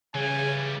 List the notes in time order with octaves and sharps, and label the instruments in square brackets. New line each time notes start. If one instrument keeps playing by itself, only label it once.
[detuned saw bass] C#3 [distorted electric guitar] E3 G3 [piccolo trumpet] G#5